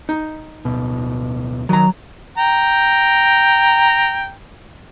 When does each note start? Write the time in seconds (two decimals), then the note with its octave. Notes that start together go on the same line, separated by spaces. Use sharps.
0.09 D#4
0.65 D1 B2
1.69 D#3 F#3 A#5
2.38 G5 A#5